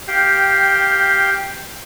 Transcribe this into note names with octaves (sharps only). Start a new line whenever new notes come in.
G4 F5 G5